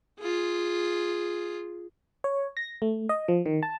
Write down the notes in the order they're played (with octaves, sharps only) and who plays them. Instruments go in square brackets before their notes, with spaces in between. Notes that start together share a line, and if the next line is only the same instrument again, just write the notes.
[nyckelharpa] F4 G#4
[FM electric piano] C#5
A#6
A3
D#5
F3
D#3
A5